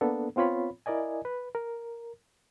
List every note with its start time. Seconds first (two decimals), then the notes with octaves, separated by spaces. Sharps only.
0.01 A#3 B3 D4 A4
0.36 B3 C4 F4 C#5 B5
0.86 E4 A#4 D5 D#5 G#5
1.25 B4
1.55 A#4